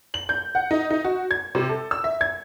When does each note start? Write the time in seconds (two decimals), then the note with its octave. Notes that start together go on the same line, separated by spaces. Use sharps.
0.14 F#7
0.29 G6
0.55 F#5
0.71 D#4
0.90 D#4
1.04 F#4
1.31 G#6
1.55 C3
1.69 A4
1.91 E6
2.04 E5
2.21 G#6